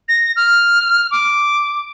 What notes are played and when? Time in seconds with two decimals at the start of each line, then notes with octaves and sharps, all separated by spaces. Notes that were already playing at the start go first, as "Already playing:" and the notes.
0.09 A#6
0.36 F6
1.11 D6